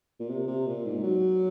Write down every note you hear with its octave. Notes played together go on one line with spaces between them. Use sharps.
A#2
C3
C3
A#2
G#2
F#3